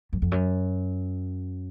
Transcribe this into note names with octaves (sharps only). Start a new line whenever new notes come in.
F#2
F2
F#2